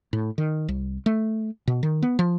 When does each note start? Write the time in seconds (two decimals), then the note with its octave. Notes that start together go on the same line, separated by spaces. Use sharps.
0.13 A2
0.38 D#3
0.69 C2
1.06 A3
1.67 B2
1.83 D#3
2.03 B3
2.19 F3